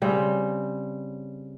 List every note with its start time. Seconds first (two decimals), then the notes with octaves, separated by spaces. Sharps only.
0.02 C#3 G3 C4